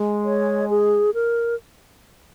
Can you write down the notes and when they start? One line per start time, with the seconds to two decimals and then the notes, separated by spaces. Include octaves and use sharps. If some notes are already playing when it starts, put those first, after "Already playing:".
Already playing: G#3
0.25 C#5
0.70 G#4
1.14 A#4